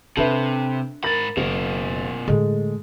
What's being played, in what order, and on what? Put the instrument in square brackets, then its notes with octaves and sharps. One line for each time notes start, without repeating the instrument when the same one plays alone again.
[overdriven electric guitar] C3 [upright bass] D4 [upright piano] A4 B4 E5
[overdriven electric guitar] G#2 B5 [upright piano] A#4 A6
[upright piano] F#1 [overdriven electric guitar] B2 A#4
[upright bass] A2 D3 [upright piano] G#3 A3